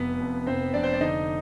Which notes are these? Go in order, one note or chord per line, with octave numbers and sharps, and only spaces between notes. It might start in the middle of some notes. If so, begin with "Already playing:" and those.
Already playing: F1 B3 B4
F2
F1 C4 C5
F1 D4 D5
C5
D5
D3 D#4 D#5